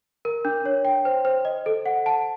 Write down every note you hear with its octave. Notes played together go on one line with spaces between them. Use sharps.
A#4
D4
C#5
G5
C5
C5
D#5
A4
F#5
A5